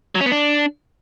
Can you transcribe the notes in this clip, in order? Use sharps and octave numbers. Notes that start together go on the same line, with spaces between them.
F#3
C#4
B3
D4